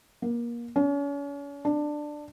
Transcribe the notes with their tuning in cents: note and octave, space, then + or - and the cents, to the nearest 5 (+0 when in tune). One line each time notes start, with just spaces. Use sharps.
A#3 +25
C#4 +40
D4 +15